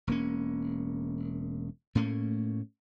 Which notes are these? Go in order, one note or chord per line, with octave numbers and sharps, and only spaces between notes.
E1 A#3 C#4
A2 A3 A#3 C#4